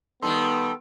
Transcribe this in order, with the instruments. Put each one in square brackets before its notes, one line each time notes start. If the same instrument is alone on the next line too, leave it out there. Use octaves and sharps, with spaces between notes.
[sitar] D#3 G3 D#4 [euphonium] B3 [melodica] A4 [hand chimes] C6